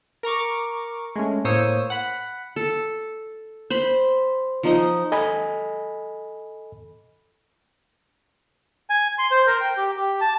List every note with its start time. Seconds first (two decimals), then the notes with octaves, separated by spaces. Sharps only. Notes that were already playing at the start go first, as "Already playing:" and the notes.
0.23 A#4 A#5 C#6 D6
1.16 G#3 A3 C#4
1.45 A2 A#3 C5 C#5 D#6 E6
1.90 F#5 B5
2.56 A4
3.70 C5 B5
4.63 F3 D#4 D#5
5.12 A4 D#5 G#5 B5
8.90 G#5
9.19 C6
9.31 C5
9.47 A#4
9.61 G5
9.77 G4
9.97 G4
10.21 A5